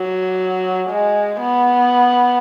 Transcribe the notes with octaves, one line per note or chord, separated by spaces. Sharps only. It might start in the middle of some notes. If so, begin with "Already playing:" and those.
Already playing: F#3
G#3
B3